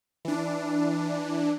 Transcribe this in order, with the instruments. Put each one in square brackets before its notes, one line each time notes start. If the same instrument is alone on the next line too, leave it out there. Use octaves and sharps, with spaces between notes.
[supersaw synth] E3 D4